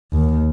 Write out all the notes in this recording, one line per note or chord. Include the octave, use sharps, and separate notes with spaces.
D#2